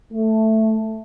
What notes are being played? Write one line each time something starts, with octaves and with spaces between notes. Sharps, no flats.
A3